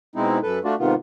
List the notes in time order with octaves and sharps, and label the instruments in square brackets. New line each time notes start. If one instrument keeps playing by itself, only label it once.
[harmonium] B2 G#3 C4 D#4 E4
F#2 A4 B4
A3 D4 F4 F#4 D5
G#2 C3 D#3 B3 F4